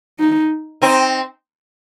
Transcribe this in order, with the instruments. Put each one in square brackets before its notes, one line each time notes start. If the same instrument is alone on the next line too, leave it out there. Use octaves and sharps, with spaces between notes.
[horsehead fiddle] D#4
[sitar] C4 D#4